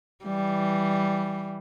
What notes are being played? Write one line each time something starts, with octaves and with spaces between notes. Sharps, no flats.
E3 G3